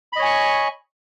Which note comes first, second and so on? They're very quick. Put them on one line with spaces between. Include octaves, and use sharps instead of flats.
B5 D#5 C#5 G#5 C#6